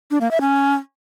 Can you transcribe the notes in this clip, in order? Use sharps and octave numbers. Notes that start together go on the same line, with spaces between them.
D4
A#3
E5
C#4